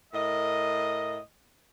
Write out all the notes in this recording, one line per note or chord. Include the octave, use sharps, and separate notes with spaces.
A2 A#4 D#5